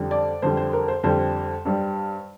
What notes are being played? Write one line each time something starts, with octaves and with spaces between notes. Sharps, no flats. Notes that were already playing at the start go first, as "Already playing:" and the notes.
Already playing: F2 D3 G3
D5
F2 D3 G3 C5
C5
A#4
C5
F2 D3 G3 C5
G2 G3